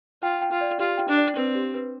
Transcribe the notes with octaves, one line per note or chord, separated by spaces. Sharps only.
F4 G5
G5
F4
D5
F4 G4
G5
D4
D5
C4 B4
G4
B4